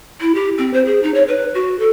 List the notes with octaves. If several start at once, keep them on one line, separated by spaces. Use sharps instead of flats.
E4
G4
C4
C5
G#4
D#4
C#5
B4
F#4
A4